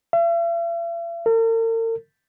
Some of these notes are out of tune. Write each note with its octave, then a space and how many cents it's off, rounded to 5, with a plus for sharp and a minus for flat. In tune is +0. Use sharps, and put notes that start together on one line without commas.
E5 +45
A#4 -45